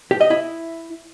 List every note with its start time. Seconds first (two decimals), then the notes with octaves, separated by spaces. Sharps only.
0.11 G4
0.21 D#5
0.30 E4